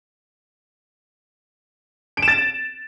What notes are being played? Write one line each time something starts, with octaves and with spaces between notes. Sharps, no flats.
D7
E7
A6